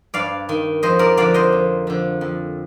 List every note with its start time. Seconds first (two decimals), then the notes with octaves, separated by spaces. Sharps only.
0.14 G2 D5 F5
0.49 D#3
0.83 F2 C5 D#5
0.99 A#4 D5
1.17 D3 F3 D5 F5
1.34 C5 D#5
1.52 F2
1.87 D3 F3
2.21 F2